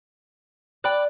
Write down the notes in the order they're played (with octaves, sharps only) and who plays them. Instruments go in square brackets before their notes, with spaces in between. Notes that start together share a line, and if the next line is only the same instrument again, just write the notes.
[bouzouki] D5 [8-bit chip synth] G5 B5 F#6